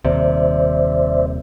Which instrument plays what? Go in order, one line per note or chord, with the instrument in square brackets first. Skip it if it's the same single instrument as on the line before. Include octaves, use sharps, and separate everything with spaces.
[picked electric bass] D#1 D#2 C3 [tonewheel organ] C5 D5 E5